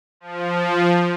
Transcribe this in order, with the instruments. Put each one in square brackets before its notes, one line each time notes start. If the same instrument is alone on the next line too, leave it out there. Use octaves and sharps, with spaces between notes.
[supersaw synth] F3